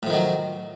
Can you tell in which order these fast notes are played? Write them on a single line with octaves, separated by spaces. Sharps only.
A2 F3 D#3 F#3